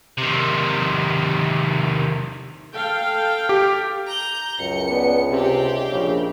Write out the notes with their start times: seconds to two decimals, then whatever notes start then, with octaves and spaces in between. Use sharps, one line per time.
0.18 C3 D#3
2.75 A4 F5 G5
3.49 G4
4.07 A#5 G6
4.60 C#2 F#2 C#7
4.89 B3 D4 D#4
5.30 C3 C4 G4
5.92 A#1 C#3